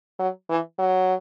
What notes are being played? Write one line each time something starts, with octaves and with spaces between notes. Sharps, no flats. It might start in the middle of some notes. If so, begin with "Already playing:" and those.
F#3
E3
F#3